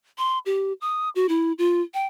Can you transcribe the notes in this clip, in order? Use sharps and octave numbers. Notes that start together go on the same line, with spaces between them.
C6
G4
D#6
F#4
E4
F4
G5